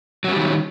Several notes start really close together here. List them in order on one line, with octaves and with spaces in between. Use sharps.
F#3 C#4 G3 D#3